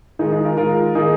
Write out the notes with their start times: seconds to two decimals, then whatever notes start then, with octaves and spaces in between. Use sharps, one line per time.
0.19 D#3 G#3 D#4 G#4
0.32 D#4 G#4
0.44 F4 A#4
0.57 D#3 G#3 F4 A#4
0.95 D#3 A#3 D#4 G#4